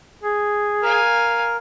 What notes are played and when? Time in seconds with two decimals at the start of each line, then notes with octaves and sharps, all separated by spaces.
0.23 G#4
0.83 A#4 F5 G#5